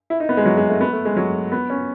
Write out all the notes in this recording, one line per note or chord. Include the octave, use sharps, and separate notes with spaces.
E4
D#4
B3
G#3
F#3
G#3
A3
B3
A3
G#3
F#3
B3
C#4